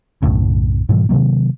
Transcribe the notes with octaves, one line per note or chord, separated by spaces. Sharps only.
B1 F#2 A2 C#3
G#2 B2 E3 G3
C3 D#3 F#3 A#3